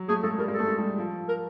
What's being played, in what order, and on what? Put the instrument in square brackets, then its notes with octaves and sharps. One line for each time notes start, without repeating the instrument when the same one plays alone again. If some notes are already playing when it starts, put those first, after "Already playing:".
Already playing: [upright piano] F#3
[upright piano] A3 [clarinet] G#4
[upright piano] G#3 [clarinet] A4
[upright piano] G3 [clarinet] A#4
[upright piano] G#3
[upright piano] A3 [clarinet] A4
[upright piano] G#3
G3
F3
[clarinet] A#4